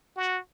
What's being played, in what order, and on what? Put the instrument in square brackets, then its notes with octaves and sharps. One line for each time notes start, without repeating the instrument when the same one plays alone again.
[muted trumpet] F#4